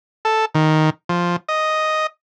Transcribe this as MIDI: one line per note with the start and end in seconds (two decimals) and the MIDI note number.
0.25 0.45 69
0.55 0.90 51
1.09 1.36 53
1.49 2.07 75